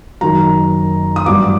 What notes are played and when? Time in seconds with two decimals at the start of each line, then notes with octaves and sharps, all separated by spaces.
0.21 F#1 F#2 D#3 F#3 A#5
1.16 D#6
1.26 A1 G2 F#3 D6